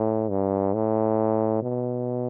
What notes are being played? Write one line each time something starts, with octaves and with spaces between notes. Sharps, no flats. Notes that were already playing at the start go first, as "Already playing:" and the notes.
Already playing: A2
G2
A2
B2